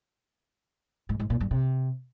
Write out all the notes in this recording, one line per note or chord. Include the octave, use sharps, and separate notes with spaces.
G#2
G#2
A#2
G2
C3